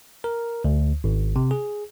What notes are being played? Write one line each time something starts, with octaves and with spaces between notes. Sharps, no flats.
A#4
D2
G#1
C3
G#4